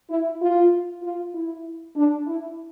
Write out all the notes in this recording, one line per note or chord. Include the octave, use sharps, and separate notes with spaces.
E4
F4
F4
E4
D4
E4